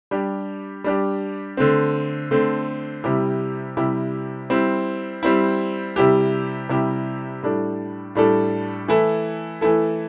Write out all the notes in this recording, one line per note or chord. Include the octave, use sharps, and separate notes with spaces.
G3 D4 G4
G3 D4 G4
D3 A3 C4
D3 A3 C4
C3 G3 E4 G4
C3 G3 E4 G4
G3 C4 E4
G3 C4 E4
C3 G3 E4 G4
C3 G3 E4 G4
A2 G3 D4 A4
A2 G3 D4 A4
E3 A3 E4 A4
E3 A3 E4 A4